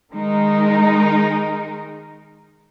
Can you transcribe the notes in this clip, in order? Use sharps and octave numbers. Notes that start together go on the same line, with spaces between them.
D#3 G#3 D#4 A#4